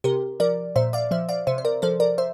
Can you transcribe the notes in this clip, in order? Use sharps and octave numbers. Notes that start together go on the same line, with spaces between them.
C3 G4 A#4
F3 A#4 D5
A#2 C5 E5
D5 F5
F3 C5 E5
D5 F5
C3 C5 E5
C5
A#4 D5
F3 A4 C5
A#4 D5
C5 E5